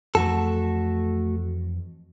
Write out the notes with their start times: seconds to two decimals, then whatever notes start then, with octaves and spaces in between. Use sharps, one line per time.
0.15 F2 E3 A3 F#4 A4